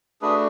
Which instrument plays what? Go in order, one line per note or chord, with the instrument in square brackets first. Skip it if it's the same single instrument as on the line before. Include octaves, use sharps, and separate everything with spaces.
[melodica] A3 D4 F#4 G#4 B4